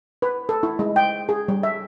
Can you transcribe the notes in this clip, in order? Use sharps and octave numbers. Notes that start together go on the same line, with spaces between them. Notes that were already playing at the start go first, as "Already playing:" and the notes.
B4
A4
E4
G#3
G5
G#4
G3
E5